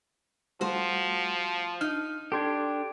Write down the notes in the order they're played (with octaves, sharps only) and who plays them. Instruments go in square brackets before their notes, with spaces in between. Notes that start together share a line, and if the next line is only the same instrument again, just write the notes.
[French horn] F3 [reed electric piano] G3 A3 [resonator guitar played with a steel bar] F#4 C5
[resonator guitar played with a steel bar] D#4 [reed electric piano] F6
[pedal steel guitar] D4 G4 [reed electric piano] A4 C6 G#6